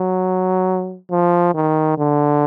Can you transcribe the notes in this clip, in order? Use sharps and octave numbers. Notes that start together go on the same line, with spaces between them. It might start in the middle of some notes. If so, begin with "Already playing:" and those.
Already playing: F#3
F3
D#3
D3